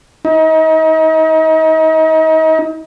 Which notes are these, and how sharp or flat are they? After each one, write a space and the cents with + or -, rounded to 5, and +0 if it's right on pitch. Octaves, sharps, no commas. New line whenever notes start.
D#4 +35